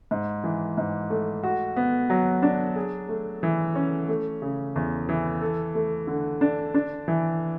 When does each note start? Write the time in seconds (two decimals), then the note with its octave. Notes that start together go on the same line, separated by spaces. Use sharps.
0.11 G#2
0.44 E3
0.78 G#2
1.10 A3
1.43 F#4
1.76 B3
2.10 F#3
2.42 D4
2.76 G#4
3.09 A3
3.43 E3
3.75 C#4
4.08 A3
4.42 C#3
4.76 E2
5.09 E3
5.41 A4
5.75 A3
6.07 D3
6.41 D4
6.74 D4
7.08 E3